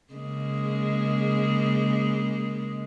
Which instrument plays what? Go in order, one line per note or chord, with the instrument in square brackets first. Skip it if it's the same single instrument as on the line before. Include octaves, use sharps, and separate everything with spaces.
[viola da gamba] C#3 G#3 A#3